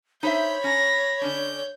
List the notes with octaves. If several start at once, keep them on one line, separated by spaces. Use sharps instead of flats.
D#4 C5 C#5 E5 B5 G6
C#4 A#5 A#6
D3 C#4 D4 G6